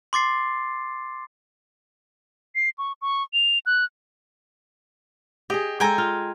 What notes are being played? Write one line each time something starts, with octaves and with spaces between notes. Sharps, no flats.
C6 D6 A6 C7
C7
C#6
C#6
F7
F#6
G4 G#4 D#5
G#3 A4 G5 G#5 A#5
F4